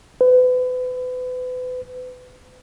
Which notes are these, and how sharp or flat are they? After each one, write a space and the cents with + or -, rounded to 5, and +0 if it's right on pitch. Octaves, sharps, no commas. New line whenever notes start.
B4 +35